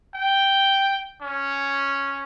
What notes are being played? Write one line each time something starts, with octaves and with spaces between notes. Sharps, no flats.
G5
C#4